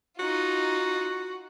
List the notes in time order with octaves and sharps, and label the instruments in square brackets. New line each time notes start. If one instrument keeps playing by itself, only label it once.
[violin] D#4 F4 [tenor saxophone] F#4